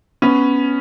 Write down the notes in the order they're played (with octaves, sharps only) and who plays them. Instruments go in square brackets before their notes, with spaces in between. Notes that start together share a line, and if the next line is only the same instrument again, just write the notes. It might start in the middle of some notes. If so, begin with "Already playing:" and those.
[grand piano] B3 C#4